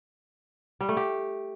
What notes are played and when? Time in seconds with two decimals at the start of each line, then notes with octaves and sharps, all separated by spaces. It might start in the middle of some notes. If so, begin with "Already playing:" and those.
0.81 G3
0.89 A3
0.97 G4